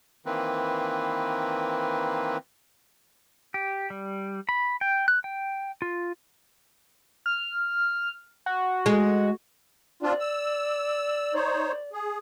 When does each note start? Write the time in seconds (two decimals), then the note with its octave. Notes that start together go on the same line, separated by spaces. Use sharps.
0.26 D#3 E3 A#3 C4 B4
3.54 G4
3.90 G3
4.49 B5
4.81 G5
5.08 F#6
5.24 G5
5.82 F4
7.26 F6
8.46 F#4
8.86 G#3
10.03 C4 D4 F4 D5
10.20 E6
11.34 D#4 C5 C#5
11.93 G#4